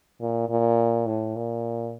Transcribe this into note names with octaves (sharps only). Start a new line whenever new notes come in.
A#2
A#2
A2
A#2